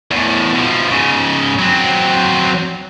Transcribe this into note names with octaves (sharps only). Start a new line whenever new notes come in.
E2 A2
B2 F3
G#2 C#3
F#3 C4